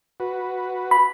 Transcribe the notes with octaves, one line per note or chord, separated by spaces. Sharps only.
F#4 B4
B5